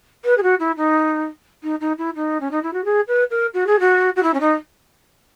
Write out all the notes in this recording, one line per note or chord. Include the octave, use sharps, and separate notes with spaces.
B4
G#4
F#4
E4
D#4
D#4
D#4
E4
D#4
C#4
D#4
E4
F#4
G#4
B4
A#4
F#4
G#4
F#4
F#4
E4
C#4
D#4